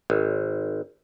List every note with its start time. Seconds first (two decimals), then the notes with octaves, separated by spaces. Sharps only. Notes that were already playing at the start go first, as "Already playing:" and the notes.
0.10 G#1